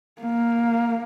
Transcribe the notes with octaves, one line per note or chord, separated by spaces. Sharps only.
A#3